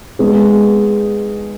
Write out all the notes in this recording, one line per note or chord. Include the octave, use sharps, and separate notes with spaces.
G#3 B3 D#4 G#4